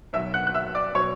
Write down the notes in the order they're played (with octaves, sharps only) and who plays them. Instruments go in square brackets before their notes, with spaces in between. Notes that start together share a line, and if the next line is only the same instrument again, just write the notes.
[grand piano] B1 B2 F#3 E5 E6
F#5 F#6
F#6
E5 E6
D5 D6
B2 F#3 C#5 C#6